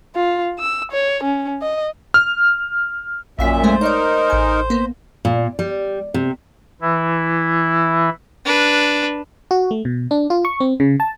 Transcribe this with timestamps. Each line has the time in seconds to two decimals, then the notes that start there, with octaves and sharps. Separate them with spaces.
0.15 F4
0.58 E6
0.92 C#5
1.23 C#4
1.62 D#5
2.14 F6
3.39 A#1 F#2 A#2 E5 F5 B6
3.64 G#3 A3 C5
3.81 D#4 A#4 C#5 D5
4.30 A1 G#5
4.70 A#3 B3
5.25 A#2
5.59 G3
6.14 C3
6.81 E3 E4
8.45 D4 B4
9.51 F#4
9.71 A3
9.85 B2
10.11 D4
10.30 F4
10.45 C#6
10.60 C4
10.80 C#3
11.00 A5